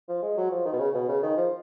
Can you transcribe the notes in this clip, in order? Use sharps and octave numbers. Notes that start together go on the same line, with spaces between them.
F3
G#3
F#3
F3
D#3
B2
C#3
B2
C#3
D#3
F3